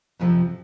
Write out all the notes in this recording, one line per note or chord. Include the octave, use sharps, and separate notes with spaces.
F2 C3 F3